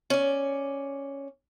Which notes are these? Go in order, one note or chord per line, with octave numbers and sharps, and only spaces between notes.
C#4 D5